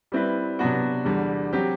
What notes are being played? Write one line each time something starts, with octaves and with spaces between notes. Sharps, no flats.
G3 C4 E4 B4
C3 F#3 B3 D4 F#4
E2 D3 G3
F#3 C4 G4